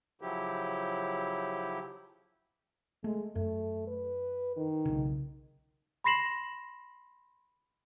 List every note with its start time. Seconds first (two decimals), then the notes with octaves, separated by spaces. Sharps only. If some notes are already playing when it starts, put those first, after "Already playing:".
0.21 C#3 F3 F#3 E4 G4
3.04 G#3 A3
3.36 F#2 A3
3.87 B4
4.56 D#3
4.85 B1 C#3
6.04 B5 C6 A#6 C7 E7 F#7